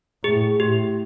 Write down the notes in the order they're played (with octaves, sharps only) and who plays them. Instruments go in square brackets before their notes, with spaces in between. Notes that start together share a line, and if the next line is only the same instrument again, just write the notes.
[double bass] A2 [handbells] G#4
[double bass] A2 [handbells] G4